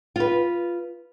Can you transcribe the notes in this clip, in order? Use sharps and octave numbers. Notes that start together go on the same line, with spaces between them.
F4 B4